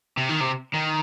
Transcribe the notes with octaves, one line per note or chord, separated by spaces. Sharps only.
C3
D#3
C3
D#3